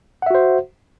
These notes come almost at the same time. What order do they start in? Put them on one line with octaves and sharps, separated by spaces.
F#5 E5 F#4 C5